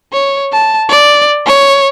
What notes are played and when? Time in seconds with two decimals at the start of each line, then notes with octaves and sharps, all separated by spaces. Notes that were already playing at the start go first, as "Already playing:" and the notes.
0.13 C#5
0.52 A5
0.89 D5
1.46 C#5